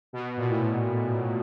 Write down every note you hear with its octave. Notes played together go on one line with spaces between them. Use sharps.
B2
A#2
A2